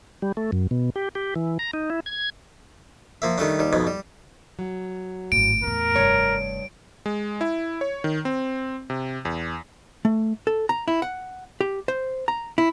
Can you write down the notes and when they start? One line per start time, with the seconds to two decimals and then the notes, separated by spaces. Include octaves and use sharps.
0.22 G3
0.37 A3
0.52 F#2
0.71 B2
0.96 G4
1.15 G4
1.36 E3
1.59 A#5
1.73 D#4
1.90 E4
2.06 G#6
3.22 F3 A#3 E5
3.38 D#3 G3 A3 D4
3.59 D#2 G3
3.73 F2 G#2 B2
3.87 G3
4.59 F#3
5.32 G#1 A2 D7
5.63 E2 A2 A#4
5.95 F1 G2 C#5
7.06 G#3
7.41 E4
7.81 C#5
8.04 D#3
8.25 C4
8.90 C3
9.25 E2
10.05 A3
10.47 A4
10.69 A#5
10.88 E4
11.02 F#5
11.61 G4
11.88 C5
12.28 A#5
12.58 E4